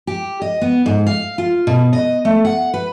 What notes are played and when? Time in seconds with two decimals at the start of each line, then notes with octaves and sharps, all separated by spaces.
0.07 G4
0.42 D#5
0.62 B3
0.86 G#2
1.07 F5
1.38 F4
1.67 B2
1.93 D#5
2.25 A3
2.45 F#5
2.74 B4